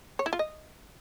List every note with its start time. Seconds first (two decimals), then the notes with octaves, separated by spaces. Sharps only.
0.19 C#5
0.26 E4
0.33 F4
0.39 D#5